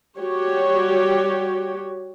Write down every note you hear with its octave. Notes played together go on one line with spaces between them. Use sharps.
G3 F#4 G4 C#5